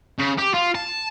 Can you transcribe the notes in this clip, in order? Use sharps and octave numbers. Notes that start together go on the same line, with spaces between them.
C#3
G4
F4
A5